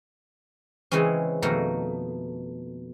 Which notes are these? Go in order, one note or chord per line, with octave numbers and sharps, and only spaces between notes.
C#3 E3 G#3 C4 C#4
F2 B2 D#3 A3 A#3